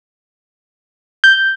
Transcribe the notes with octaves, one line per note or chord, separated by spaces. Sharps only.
G6